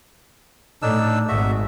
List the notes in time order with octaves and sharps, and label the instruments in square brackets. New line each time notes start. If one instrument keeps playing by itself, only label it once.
[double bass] A2 [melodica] D4 D#4 E6
[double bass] G#1 G#2 [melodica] F#4 E5